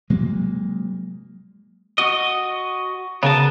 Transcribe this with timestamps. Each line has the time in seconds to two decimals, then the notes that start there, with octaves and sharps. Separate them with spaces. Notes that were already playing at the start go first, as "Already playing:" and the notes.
0.10 C3 F#3 G#3 A#3
1.98 F#4 D#5
3.23 C#3 B3 A#4 A5